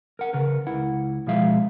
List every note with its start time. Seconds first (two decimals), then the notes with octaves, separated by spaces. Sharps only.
0.19 A#4 F#5
0.33 C#3 A#4 B4
0.67 C#2 E4 F#5
1.27 B2 F3 G#3 G#4 E5 F5